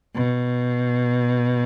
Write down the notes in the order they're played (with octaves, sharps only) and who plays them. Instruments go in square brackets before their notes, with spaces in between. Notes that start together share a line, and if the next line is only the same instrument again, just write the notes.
[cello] B2